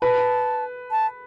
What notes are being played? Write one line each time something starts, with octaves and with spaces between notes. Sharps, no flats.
B4 A5
A5